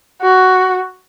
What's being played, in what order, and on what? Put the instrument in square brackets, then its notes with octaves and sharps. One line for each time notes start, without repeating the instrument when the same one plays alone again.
[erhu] F#4